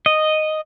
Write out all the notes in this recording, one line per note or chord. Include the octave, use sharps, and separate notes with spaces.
D#5